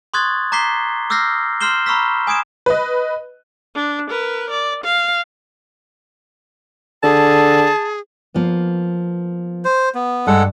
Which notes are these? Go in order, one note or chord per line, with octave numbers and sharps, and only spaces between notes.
C6 C#6 D#6 F#6 G#6 A6
A#5 D6 G6 B6 C7 G7
D6 E6 F6 G6 A#6 C7
C6 F6 G6 C7 E7 G7
A#5 B5 C#6 E6 F6 B6
G#5 D#6 G#6 D7 E7
B4 D#5
D4
A#4 B4
D5
F5
D3 G#4 A5
F3 A#3 B3
C5
B3
G2 G#3 A4 F#5